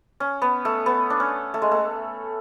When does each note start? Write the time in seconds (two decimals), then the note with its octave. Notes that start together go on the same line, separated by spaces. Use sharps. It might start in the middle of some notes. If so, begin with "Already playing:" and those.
0.20 C#4
0.42 B3
0.65 A3
0.86 B3
1.10 D4
1.20 C#4
1.54 A3
1.62 G#3
1.71 A3